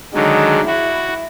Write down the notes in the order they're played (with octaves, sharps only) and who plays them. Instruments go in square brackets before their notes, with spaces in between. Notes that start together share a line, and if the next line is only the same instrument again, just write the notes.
[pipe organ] D3 D#3 F#3 [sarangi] G#3
[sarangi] E4 [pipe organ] F#4